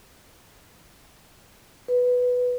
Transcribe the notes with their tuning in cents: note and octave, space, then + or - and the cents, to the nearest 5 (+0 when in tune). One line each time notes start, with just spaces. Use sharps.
B4 +5